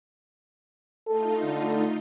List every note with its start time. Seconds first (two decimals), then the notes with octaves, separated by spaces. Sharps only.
1.07 A3 D#4 F4 A4
1.43 D3